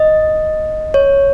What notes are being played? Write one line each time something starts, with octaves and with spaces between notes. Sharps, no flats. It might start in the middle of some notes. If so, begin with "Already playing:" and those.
Already playing: D#5
C#5